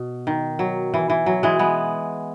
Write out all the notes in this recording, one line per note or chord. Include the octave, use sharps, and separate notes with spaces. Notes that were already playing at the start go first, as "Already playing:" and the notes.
Already playing: B2
D#3
F#3
E3
E3
F#3
E3 G#3
G#3 B3